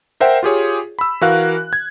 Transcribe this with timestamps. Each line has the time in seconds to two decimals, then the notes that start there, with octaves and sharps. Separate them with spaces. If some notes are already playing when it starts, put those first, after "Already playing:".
0.20 A#4 C5 E5 F#5 G5
0.43 F4 G4 G#4 C#5
0.99 B5 E6
1.21 E3 F#4 A#4 F5 F#6
1.73 G#6